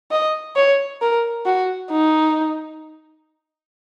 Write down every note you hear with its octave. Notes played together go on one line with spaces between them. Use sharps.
D#5
C#5
A#4
F#4
D#4